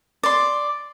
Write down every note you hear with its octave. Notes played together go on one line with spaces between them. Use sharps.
D5 C6